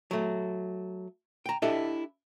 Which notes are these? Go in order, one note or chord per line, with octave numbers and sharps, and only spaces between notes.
F#3 A3
G5 A#5
D4 E4 G4 A4 D#5 E5